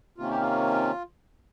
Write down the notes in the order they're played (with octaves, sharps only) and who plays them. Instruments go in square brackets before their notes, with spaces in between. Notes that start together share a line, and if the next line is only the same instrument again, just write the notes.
[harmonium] C3 D#3 A#3 C#4 F4
G4
F4